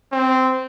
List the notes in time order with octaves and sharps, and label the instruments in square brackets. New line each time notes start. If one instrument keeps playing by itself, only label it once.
[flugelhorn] C4